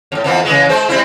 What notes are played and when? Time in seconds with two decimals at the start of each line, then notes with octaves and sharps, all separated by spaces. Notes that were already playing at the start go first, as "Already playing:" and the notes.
0.12 F2 A2
0.24 F2 E3 B3
0.45 C#3 E3 G#3
0.69 G#3 C5
0.89 G3 C4 E4